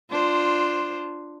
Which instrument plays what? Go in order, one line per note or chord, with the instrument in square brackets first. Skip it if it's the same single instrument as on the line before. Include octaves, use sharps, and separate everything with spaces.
[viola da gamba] D4 F4 C5